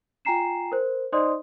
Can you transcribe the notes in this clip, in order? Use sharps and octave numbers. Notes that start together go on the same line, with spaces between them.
F4 G5 G#5 A#5 C7 E7
A#4 C5
D#4 C5 D5 D#5 C6 D#6